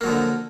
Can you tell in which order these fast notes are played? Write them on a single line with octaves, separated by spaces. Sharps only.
A#3 F#3 F3 D3